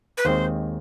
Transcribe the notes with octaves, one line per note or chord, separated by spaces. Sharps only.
B4
D#2 D#3 G#3 C4 C5